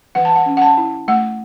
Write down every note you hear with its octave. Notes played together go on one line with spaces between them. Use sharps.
E3 F#5
A5
F#5
C#4
F#5
A5
E4
A3 F#5